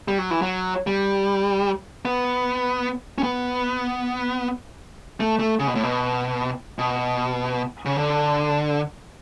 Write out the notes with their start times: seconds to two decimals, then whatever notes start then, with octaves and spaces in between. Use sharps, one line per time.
0.08 G3
0.19 F#3
0.31 E3
0.42 F#3
0.87 G3
2.05 B3
3.18 C#4
3.23 B3
5.20 A3
5.39 A3
5.59 C#3
5.67 B2
5.75 A2
5.83 B2
6.78 B2
7.85 C#3
7.96 D3